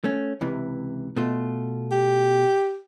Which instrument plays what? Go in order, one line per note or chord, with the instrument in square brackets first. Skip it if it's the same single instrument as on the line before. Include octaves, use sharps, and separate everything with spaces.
[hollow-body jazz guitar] A3 C#4
C#2 C3 E3
B2 A3 F4
[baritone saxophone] G4